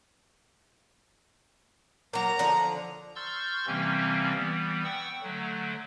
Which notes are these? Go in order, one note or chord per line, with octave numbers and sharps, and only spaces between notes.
F#3 A#3 A#5
D3 F3
C6 C#6 E6 F6 G6 A6
C3 E3 G3 A#3 C4 C#4
E3 G3 B3
F#5 G5 C#6 E6
D3 F#3 A3